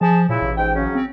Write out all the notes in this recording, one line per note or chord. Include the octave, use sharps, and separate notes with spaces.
F3 G#4 A5
A#2 C#3 E4
A1
G#2 G5
C#3 F#3 C#4
C4